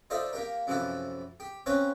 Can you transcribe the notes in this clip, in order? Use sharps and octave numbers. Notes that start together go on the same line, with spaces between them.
D#4 F4 A4 C5 D5 E5
A#3 G4 A#4
F#2 C3 E3 F3 E4 A4
G4
C4 C#4 B4 C#5 F5